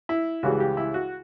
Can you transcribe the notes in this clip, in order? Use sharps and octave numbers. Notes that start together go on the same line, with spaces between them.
E4
C#2 C#3 E3 G3 F#4
G4
E4
F#4